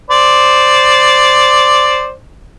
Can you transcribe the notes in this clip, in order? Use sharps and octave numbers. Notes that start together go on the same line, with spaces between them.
C5 D5